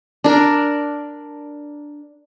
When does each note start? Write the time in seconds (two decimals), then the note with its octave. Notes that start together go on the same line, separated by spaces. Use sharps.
0.24 D4 A#4